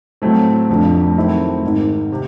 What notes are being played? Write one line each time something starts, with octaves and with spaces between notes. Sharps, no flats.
A2 F#3 A3 C4
F1 F2 D3 F3 A3
D#3 F#3 A3 C4 E4
G#1 G#2 D#3
C3